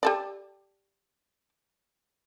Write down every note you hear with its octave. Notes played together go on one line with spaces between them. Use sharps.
G4 A4 D5